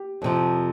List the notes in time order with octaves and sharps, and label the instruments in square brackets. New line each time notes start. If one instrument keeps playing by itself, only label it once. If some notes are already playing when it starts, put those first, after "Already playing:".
Already playing: [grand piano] G4
[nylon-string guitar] F2 C3 F3